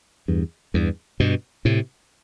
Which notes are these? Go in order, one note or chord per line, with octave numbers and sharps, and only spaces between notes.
E2 G2
E2 G2
G2 B2
A2 C3